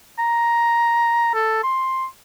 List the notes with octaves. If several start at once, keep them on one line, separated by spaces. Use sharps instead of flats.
A#5
A4
C6